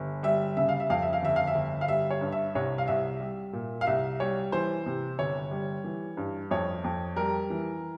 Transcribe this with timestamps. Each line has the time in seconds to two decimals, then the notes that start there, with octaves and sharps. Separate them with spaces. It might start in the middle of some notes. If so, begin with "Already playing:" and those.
Already playing: G1
0.23 G3 E5
0.57 C#3 E5
0.69 F5
0.80 E5
0.90 F2 F5
1.02 E5
1.13 F5
1.22 G1 E5
1.36 F5
1.47 E5
1.55 G1
1.81 F5
1.88 G3 E5
2.10 C#5
2.21 G2
2.32 E5
2.55 C2 C#5
2.78 F5
2.88 C2 E5
3.20 G3
3.53 A#2
3.81 F5
3.86 C2 E5
4.20 G3 C#5
4.52 E3 C5
4.86 C3
5.19 G1 C#5
5.51 G3
5.84 E3
6.17 G2
6.51 F2 C#5
6.84 F2
7.16 G3 A#4
7.50 E3